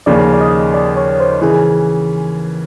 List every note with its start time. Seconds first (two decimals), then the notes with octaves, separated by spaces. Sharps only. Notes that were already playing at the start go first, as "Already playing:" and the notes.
0.06 D#2 C#3 F3 D5
0.33 D5
0.41 D#5
0.74 D5
0.97 C#5
1.20 C5
1.42 C#3 E3 G#4